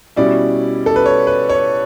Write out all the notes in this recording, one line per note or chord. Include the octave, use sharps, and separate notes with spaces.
B2 G3 C#4 E4 D5
A4
B4
C#5
B4
C#5